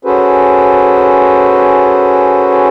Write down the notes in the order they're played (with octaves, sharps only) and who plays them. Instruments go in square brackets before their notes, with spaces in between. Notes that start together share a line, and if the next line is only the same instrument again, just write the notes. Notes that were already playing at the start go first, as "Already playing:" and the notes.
[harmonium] C#4 F#4 G#4 A4 B4 C5